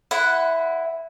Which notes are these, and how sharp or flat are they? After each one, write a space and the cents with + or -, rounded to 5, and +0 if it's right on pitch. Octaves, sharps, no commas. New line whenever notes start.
E4 +0 C5 -40 F#5 +0